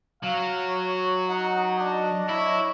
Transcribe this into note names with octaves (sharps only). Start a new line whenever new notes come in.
F#3 F5
C#5
D#4 F#5
D4 D#5
E4 C#5